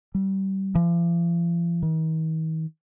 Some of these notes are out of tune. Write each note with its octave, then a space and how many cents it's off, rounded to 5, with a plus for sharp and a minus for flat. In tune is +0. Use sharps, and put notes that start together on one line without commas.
G3 -25
F3 -45
D#3 +45